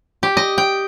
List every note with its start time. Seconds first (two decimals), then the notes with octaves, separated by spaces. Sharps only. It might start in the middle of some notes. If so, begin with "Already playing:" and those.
0.23 G4
0.37 D#5
0.58 G5